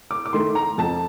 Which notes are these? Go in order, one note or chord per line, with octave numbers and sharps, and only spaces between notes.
D6
D6
D#3 A3 C6
A#5
F2 A5